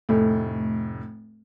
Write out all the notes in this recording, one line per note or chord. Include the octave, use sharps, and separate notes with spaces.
F1 A2